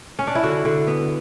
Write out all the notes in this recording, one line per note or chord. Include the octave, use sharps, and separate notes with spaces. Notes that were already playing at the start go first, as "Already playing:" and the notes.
C#4
D4
E4
D3 F#4
D3
B3